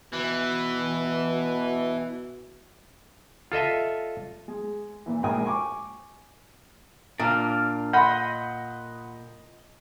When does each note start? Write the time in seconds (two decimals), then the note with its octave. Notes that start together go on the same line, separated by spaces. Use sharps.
0.13 B2 E3
3.52 F4 A4 D#5 E5
4.48 G#3
5.06 A#2 E3
5.23 A#1 G#2 A#4 G5 G#5 D#6
5.46 G#5 C#6 D6
7.20 A#2 D4 F6
7.93 D#5 F#5 B5 C6 G6